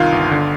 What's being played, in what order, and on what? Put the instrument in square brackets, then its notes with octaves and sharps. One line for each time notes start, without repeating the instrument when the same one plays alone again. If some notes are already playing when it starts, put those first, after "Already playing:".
Already playing: [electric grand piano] C2 D#3 F4 F5
G1
D3